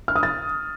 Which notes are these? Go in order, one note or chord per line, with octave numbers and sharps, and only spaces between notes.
F6
D#6
A6